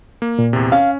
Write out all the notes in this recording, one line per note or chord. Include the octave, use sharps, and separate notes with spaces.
A#3
A#2
E2 C3
C#4 F5